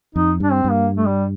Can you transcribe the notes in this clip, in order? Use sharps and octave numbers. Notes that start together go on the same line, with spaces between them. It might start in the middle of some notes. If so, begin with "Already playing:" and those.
F2 D#4
G2 D4
C4
G2
A#3
A3
G3